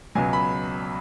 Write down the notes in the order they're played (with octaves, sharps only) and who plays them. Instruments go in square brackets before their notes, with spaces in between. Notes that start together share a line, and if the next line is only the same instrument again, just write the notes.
[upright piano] C#2 B2 F#3 G#5
B5